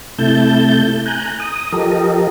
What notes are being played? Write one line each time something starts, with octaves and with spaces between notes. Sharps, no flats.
C3 A3 E4 A5 G6
G#5 A#5 F#6 G6
D#6
F3 G4 A4 A#4 D#5